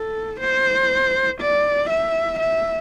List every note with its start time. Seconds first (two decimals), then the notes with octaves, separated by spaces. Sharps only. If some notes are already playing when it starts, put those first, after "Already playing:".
Already playing: A4
0.41 C5
1.41 D5
1.90 E5
2.40 E5